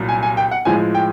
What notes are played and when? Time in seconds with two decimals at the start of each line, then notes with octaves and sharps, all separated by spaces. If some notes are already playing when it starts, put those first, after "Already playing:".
Already playing: C2 A#2 F#3
0.09 G#5
0.23 G#5
0.37 G5
0.51 F#5
0.65 A2 F3 G#3 G#5
0.95 G5